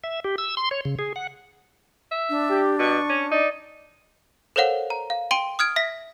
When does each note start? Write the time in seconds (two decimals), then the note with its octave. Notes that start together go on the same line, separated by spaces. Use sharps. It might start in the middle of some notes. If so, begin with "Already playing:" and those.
0.04 E5
0.24 G4
0.38 E6
0.57 C6
0.71 C#5
0.85 C#3
0.99 G#4
1.16 F#5
2.12 E5
2.29 D4
2.49 G4
2.79 B2 C#6
3.09 C#4
3.31 D#4 D5
4.56 A4 A#4 C5 C#5 F5 F#5
4.90 A#5
5.10 F5
5.31 G5 C6 D7 D#7 G7
5.59 D#6 F6 G#6 D7
5.76 E5 A#6 B6